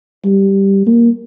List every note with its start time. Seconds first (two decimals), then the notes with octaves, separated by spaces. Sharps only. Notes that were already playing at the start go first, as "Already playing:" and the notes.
0.25 G3
0.87 A#3